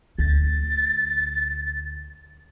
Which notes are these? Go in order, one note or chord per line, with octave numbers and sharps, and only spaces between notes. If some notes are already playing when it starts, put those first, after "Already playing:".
D2 A6